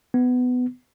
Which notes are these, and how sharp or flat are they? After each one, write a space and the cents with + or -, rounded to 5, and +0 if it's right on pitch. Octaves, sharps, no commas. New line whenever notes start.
B3 +15